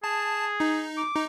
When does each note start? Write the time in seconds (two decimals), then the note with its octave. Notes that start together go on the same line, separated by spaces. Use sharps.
0.04 G#4 A5
0.60 D#4
0.97 D6
1.15 D#4